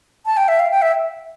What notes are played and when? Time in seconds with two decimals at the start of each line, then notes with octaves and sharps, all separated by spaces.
0.26 A5
0.37 G5
0.48 E5
0.59 F5
0.71 G5
0.82 E5